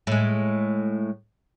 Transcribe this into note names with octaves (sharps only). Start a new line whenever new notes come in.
A2 G#3